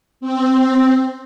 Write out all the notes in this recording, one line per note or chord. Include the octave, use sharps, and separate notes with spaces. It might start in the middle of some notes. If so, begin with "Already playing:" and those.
C4